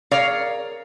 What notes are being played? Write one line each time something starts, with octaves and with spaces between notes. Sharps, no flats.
G#4 A#4 C#5 D5 F5